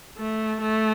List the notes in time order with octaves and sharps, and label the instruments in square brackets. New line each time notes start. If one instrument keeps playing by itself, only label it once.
[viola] A3
A3